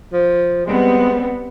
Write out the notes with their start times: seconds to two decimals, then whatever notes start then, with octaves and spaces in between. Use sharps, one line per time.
0.13 F3
0.66 G3 G#3 B3 C4